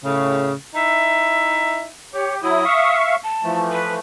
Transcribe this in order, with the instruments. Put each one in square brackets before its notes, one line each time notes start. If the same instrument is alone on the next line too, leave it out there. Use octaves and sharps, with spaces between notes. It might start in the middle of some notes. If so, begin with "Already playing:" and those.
[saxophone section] A2 C#3
D#4 E4 E5
[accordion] G4 [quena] C#5
[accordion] F#3 E4 [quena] D#6
[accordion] E5 F5 C#6
[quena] A5
[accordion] E3 F3 A3
[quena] B4